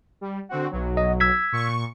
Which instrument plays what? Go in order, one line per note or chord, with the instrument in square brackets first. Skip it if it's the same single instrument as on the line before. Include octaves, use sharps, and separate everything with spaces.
[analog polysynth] G3
D3 C4 F#4
B1 F#3
[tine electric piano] D#5
E6 G#6 B6
[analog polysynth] A#2 C#6